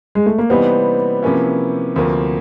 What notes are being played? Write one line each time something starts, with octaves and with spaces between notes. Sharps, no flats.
G#3
A3
A#3
C3 E3 G3 B3 C4 D#4
C3 F3 A#3 C#4 E4
D2 C3 F3 A#3